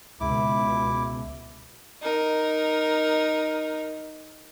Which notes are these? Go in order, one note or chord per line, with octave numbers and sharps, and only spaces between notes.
C#2 B2 E4 D6
D#4 A#4